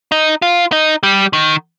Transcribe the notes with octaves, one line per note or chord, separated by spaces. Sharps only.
D#4
F4
D#4
G3
D#3